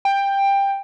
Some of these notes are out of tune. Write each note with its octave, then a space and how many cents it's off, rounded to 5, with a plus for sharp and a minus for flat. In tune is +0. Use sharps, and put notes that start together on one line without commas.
G5 +15